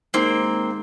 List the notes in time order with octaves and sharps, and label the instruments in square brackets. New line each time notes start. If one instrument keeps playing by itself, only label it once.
[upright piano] D#2 D#3 G#3 [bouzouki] A#3 C4